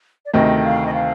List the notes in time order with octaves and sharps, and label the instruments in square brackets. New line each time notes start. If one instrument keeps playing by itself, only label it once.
[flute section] D5
[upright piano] D2 C3 D#3 A3 [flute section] D#5
[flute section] F5
D#5
F5